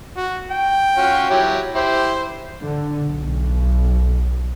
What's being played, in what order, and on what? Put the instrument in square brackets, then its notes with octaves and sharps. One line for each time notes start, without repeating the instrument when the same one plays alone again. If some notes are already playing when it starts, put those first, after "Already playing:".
[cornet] F#4
G5
[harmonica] C#4 F4 F#4
F#3 E4 G4
[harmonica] E4 G4 [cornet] C5
[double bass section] D3
B1